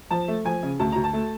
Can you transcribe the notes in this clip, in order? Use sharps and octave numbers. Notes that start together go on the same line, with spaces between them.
F3 A5
A3
F3 G#5
C#3
D2 A5
D2 A#5
A5
A3